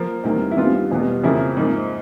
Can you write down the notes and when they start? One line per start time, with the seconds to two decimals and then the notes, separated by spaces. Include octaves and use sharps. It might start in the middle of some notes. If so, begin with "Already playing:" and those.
Already playing: F3 A#3
0.24 E2 C3 D#3 G3 A#3
0.51 E4
0.57 G2 D#3 G3 B3 F4
0.91 E2 B2 G3 B3
1.24 F2 C#3 F3 A#3 C#4 E4
1.57 G#2 F3 A#3